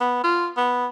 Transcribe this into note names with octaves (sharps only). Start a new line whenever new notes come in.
B3
F4
B3